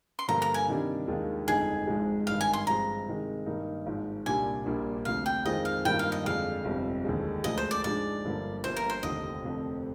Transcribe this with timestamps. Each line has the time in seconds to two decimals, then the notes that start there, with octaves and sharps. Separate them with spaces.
0.19 C6
0.28 G2 D3 F3 A#3 F4 A#5
0.42 A#5
0.54 G#5
0.67 C3 D#3 G3 D4
1.07 D#2 D#3 G#3 D4 F4
1.47 G1 F2 D3 G#3 D#4 G#4
1.87 G#1 G#2 F3 G#3
2.27 G#1 G2 D#3 F5
2.41 G#5
2.53 C6
2.67 G2 F3 G#3 C4 A#5
3.07 C3 D#3 G#3
3.46 G2 D#3 A#3 D#4
3.86 G#1 G#2 F3
4.26 C2 A#2 G3 D4 G4 G#5
4.65 A#1 A#2 G3 A#3 D4
5.05 D2 C3 F3 F5
5.26 G5
5.45 F2 D#3 G#3 C4 F4 D#5
5.65 F5
5.85 G2 D#3 G3 A#3 F4 G5
5.99 F5
6.12 D#5
6.24 F2 D3 G#3 D4 F4 F5
6.64 G1 F2 C3 G3
7.04 D#2 D3 F3 G#3
7.44 D2 D3 F3 G#3 D#5
7.58 C5
7.71 D5
7.84 G#2 F3 G#3 D4 D5
8.24 G1 G2 D3 F3 A#3
8.63 G1 G2 F3 A#3 C5
8.76 A#4
8.90 C5
9.03 F1 D#2 D3 F3 C4 D#5
9.43 F1 F2 D3 F3 C4